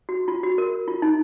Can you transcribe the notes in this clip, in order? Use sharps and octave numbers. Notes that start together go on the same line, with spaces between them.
F#4
F4
F#4
A#4
F4
D#4